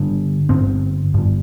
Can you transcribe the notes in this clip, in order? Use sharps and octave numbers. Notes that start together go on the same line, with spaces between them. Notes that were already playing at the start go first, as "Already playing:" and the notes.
Already playing: G2 D3
G2 D3 C4
G2 D3